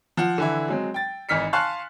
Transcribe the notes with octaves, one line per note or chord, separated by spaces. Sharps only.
F3 F#5
D3 E3 E4
F#3 G#3 C4
G5 A6
G#1 E3 D#4 F6 B6 C#7
F5 G#5 A5 C6 C#6 F#6